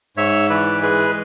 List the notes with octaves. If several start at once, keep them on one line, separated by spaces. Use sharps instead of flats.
G#2 C#5 E5
E3 B4 D5
G#3 G#4 B4